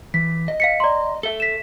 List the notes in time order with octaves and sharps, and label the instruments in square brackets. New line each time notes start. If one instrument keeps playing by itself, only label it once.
[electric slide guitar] E3 [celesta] B6
[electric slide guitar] D#5
[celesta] F5 B6 C#7
D5 A#5 C6
[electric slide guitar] A4 E5 [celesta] G7
[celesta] B6 E7